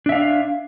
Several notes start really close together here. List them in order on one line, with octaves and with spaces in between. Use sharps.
D4 E5 F5